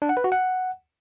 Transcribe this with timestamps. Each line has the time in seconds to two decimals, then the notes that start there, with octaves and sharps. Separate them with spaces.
0.02 D4
0.09 F#5
0.17 B4
0.24 F#4
0.32 F#5